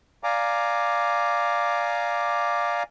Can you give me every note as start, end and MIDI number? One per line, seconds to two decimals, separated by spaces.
0.24 2.83 74
0.24 2.83 77
0.24 2.83 80
0.24 2.83 82
0.24 2.83 86